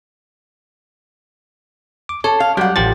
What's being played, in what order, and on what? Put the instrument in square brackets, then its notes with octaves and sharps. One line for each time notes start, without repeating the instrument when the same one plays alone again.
[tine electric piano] D6
[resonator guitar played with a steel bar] A4 [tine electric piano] C#5
[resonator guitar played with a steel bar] F5
[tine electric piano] F#3 G3 [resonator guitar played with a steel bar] G4 F#5
[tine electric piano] A1 G4 A6 [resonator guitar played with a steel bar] F3